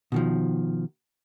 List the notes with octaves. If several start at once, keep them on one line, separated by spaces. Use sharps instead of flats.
B2 D#3 F3